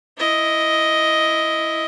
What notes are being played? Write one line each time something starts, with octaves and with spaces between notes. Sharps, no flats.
E4 D#5